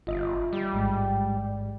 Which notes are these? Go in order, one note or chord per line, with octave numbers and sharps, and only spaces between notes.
G1 F4 D#5 E5
G3
A1 G#2 G#3